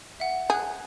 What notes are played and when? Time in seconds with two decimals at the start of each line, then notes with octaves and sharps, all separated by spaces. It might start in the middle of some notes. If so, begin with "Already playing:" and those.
0.20 E5 F#5
0.50 G#4 F#6 G6